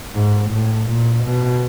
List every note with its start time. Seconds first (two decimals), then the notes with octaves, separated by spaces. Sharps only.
0.15 G#2
0.51 A2
0.89 A#2
1.25 B2